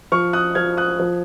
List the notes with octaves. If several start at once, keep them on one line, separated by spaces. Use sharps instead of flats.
F3 C#6 F6
D#6 F#6
F3 F6 G#6
D#6 F#6
F3